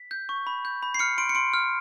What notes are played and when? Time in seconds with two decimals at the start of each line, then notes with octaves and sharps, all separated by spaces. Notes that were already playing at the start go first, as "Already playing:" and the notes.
Already playing: B6
0.11 G6
0.29 C#6
0.47 B5
0.65 G6
0.83 B5
0.94 C7
0.99 F6 C#7
1.18 C6 D7
1.29 C#7
1.35 C6 D7
1.54 F6